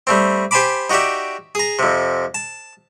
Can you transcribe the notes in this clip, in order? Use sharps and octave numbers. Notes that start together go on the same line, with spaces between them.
G3 A3 C4
G4 C5 G#5 A5 B5 D6
D#4 F#4 G4 D5 E5
G#4 A#5
F2 C3
A5